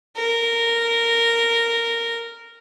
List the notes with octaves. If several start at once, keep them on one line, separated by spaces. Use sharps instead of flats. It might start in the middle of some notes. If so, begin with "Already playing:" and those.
A#4